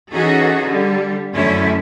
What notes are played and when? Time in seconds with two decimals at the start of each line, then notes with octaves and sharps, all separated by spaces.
0.13 E3 C#4 D#4 F#4 G#4 A4
0.67 D3 G3
1.32 F#2 D3 A3 C#4 E4